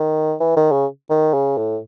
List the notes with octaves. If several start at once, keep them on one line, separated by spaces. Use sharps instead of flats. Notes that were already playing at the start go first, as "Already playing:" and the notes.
Already playing: D#3
E3
D#3
C#3
D#3
C#3
A2